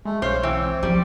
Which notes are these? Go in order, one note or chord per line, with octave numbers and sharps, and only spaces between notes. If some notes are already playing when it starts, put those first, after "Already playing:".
G#3 A3
B1 C5 C#5 F5
E3 C4
F3 G3